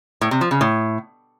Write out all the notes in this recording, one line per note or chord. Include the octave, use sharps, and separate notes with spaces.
A2
C3
F3
C#3
A2